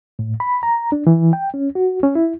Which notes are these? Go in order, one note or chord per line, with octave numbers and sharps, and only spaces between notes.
A2
B5
A#5
D4
E3
G5
C#4
F#4
C#4
E4